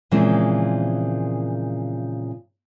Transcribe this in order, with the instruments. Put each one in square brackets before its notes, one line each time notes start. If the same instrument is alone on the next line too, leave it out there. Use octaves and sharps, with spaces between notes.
[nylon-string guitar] A#2 C#3 E3 F3 G#3 C4